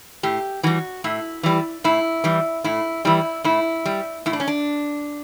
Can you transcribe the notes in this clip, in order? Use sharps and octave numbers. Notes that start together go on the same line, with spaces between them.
A2 G4
E3 G3 F#4
A2 E4
E3 G3
A2 E4
E3 G3
A2 E4
E3 G3 E4
A2 E4
G3
A2 E4
D4
C#4
D4